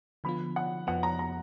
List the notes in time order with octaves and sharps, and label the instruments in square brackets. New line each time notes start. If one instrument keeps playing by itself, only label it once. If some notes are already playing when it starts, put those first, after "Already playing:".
[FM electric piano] D3 F3 B3 F4 [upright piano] B5
[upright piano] F#5
[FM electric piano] F2 F3 B3 [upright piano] F#5
[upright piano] A#5
A#5